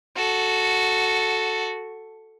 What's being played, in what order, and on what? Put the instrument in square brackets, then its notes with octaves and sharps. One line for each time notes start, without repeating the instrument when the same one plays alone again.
[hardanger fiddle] F#4 A4